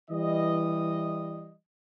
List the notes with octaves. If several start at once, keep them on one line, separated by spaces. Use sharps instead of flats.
E3 G3 D#5